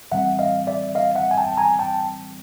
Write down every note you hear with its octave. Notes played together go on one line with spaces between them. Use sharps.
A2 E3 G3 C4 E5 F#5
D#5 F5
D5 E5
D#5 F5
E5 F#5
G#5
G5 A5
G#5 A#5
G5 A5